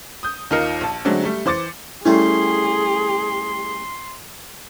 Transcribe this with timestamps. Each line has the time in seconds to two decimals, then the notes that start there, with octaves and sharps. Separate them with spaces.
0.23 D#6 G6
0.51 D#2 D#4 F4 A#4 C#7
0.81 A#1 A5
1.05 D3 F#3 G#3 A3 C4 D4
1.24 G3 A3
1.46 E3 C5 D6 A6 C#7
2.06 G3 A3 C#4 E4 G#4 C6